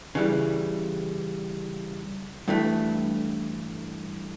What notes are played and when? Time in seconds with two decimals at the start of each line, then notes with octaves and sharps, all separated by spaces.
0.15 C#3 E3 G3
2.48 G2 E3 A3